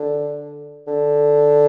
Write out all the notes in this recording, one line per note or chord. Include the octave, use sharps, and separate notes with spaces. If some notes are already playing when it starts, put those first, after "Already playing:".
Already playing: D3
D3